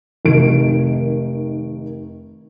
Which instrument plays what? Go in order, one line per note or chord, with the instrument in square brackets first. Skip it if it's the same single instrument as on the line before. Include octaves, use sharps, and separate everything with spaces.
[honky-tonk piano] F1 D#3 D7